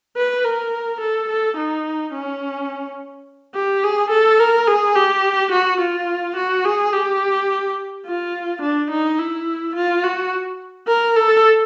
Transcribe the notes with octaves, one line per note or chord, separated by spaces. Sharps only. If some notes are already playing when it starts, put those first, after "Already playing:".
B4
A#4
A4
A4
D#4
C#4
G4
G#4
A4
A#4
G#4
G4
F#4
F4
F#4
G#4
G4
F4
D4
D#4
E4
F4
F#4
A#4
A4